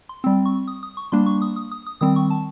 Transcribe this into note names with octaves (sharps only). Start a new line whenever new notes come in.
C6
G3 C4
C#6
D#6
D#6
C#6
G3 A#3 D4 C6
C#6
D#6
D#6
D#6
D#6
D#3 G3 C4 D#6
C#6
A5